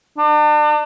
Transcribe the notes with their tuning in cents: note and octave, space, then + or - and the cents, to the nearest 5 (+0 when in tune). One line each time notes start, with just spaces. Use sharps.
D4 +40